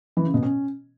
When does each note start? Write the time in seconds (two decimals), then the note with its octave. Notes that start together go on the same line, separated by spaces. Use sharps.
0.17 E3
0.25 C#3
0.34 B2
0.43 C#4